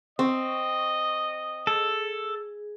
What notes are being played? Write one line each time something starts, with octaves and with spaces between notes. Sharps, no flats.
C4 D#5 C#6
G#4 A4